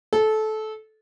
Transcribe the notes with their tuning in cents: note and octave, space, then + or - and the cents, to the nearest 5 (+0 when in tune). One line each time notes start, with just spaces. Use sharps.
A4 -20